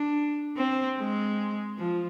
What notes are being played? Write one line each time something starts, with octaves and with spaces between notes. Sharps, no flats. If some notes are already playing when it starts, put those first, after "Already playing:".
Already playing: D4
C4
G#3
F3